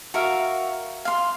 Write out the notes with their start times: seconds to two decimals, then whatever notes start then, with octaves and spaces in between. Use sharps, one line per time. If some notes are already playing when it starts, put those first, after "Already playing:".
0.14 F#4 A#4 E5 F5
1.05 F5 C6